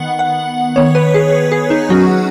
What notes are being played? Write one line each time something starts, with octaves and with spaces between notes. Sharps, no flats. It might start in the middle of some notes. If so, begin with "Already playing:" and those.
Already playing: D#3 B3 F#5
F#5
D#3 B3 C#5
B4
G#4
G#4
D#4
F#3 C#4 F#4